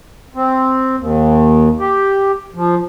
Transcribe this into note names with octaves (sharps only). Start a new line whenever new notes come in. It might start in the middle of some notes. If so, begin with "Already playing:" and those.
C4
D#2
G4
F3